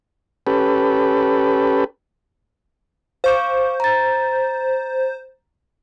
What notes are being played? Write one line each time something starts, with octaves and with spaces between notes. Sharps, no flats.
C#4 G4 A4 B4
C5 F5 C#6 D6
A#5 A6